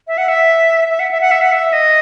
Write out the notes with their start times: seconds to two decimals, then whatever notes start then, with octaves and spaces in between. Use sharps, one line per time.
0.07 E5
0.18 F#5
0.28 E5
0.90 E5
1.00 F#5
1.11 E5
1.21 F#5
1.31 E5
1.41 F#5
1.52 E5
1.73 D#5